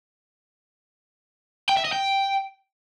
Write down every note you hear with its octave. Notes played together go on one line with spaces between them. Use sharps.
G5
E5
D#5
G5